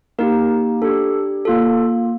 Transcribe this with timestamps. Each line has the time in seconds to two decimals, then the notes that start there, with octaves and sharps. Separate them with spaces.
0.19 A#3 D#4 G4 A#4
0.82 D4 G4 A4
1.45 A#3 F4 A4